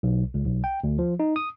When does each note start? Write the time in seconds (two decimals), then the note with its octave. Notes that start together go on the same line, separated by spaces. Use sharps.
0.03 B1
0.34 C#2
0.46 B1
0.64 G5
0.84 D2
0.99 F3
1.20 D#4
1.36 D#6